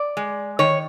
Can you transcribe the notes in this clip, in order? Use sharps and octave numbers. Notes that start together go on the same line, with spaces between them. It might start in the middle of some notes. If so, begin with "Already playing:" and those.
Already playing: D5
G#3
D#3 C#5